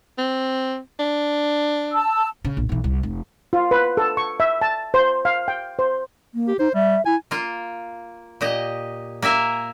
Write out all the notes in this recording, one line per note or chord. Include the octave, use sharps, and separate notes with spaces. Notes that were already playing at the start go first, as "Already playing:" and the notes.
C4
D4
A5 E6
C#3
A#1
B1 E3
C2
F1
F4
B4
A4
C#6
E5
A5
C5
F5
G5
C5
A#3
G4
D#4 C5
G3 E5
E4 G#5
A#3 F4
A#2 G4 D#5
A#3 A#4 E5 G#5